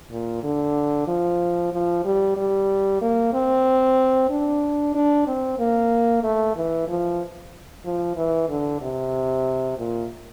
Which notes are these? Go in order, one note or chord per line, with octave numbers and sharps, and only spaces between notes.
A#2
D3
F3
F3
G3
G3
A#3
C4
D4
D4
C4
A#3
A3
E3
F3
F3
E3
D3
C3
A#2